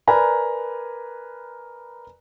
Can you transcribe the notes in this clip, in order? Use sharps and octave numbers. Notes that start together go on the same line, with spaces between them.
A#4 B4 D5 G#5 A#5 B5